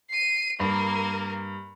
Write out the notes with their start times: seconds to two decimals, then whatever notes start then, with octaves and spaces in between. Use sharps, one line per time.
0.10 C7 D#7
0.60 G2 A#3 A#4